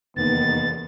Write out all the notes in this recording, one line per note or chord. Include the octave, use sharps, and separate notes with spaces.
F1 E2 D#3 A#3 B3 A6